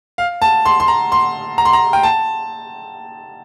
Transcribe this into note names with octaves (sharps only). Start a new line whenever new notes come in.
F5
A5
C6
C6
A#5
C6
A#5
C6
A#5
G5
A5